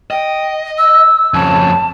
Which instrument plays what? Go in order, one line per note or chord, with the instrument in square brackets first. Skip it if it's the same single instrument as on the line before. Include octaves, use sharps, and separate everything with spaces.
[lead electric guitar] D#5 [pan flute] G5
[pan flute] E6
[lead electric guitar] F2 C#3 [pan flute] A5